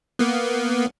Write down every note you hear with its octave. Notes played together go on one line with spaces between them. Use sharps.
A#3 B3